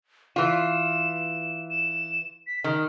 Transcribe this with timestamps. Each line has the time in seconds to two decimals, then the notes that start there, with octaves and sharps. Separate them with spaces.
0.36 E3 F4 E7
1.70 E7
2.47 B6
2.64 D#3 F6